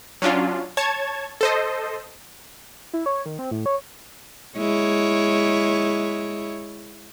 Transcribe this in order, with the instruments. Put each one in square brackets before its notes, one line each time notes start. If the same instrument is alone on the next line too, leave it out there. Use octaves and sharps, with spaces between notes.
[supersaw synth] F#3 C#4 D4 F4
C#5 A5 G#6
A4 C5 D#5
[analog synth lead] E4
C#5
D#3
C4
A2
C#5
[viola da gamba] G#3 E4 C#5